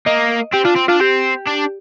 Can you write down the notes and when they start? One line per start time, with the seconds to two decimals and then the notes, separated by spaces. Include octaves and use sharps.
0.06 A#3 D#5
0.53 C4 G4
0.65 D4 F4
0.76 C4
0.88 D4 F4
1.00 C4 G4
1.47 D4